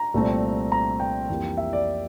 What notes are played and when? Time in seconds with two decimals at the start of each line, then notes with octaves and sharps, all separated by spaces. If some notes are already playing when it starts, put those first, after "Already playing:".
Already playing: A#5
0.14 C2 A#2 A3 C4
0.72 A#5
1.00 G5
1.30 F2 E3 G3 A#3
1.57 E5
1.73 D5